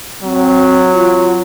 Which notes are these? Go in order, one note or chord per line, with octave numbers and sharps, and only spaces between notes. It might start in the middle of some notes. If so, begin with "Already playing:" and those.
F#3 C4
F4